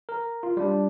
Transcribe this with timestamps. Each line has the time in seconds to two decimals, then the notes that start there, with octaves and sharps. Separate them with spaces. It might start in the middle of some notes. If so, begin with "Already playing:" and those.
0.09 A#4
0.43 F4
0.57 G3 D4